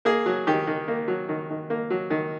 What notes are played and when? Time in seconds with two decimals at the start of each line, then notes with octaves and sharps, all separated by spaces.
0.05 A#3 G#4
0.26 F#3
0.47 D#3 G4
0.67 D#3
0.88 A#3
1.08 F#3
1.29 D#3
1.50 D#3
1.70 A#3
1.90 F#3
2.10 D#3